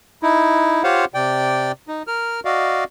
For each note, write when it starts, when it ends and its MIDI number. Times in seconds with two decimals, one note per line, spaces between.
0.23 0.83 63
0.23 0.83 64
0.84 1.05 65
0.84 1.05 67
0.84 1.05 72
0.84 1.05 73
0.84 1.05 77
0.84 1.05 78
1.14 1.72 48
1.14 1.72 74
1.14 1.72 79
1.88 2.03 63
2.07 2.40 70
2.07 2.40 89
2.45 2.84 66
2.45 2.84 74
2.45 2.84 75
2.45 2.84 77